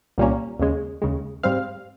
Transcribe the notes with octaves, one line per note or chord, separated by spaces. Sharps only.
C2 A#2 G3 A#3 C#4
D#2 C#3 G#3
D#2 C#3 G#3
G#2 G3 C4 F5